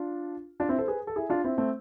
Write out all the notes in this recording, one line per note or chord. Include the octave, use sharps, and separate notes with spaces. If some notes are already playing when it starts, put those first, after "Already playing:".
Already playing: D4 F4
D4 F4
C4 E4
A4 C5
G#4 B4
A4
E4 G#4
D4 F4
C4 E4
A3 C4